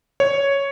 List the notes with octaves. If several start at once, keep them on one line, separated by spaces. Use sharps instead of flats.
C#5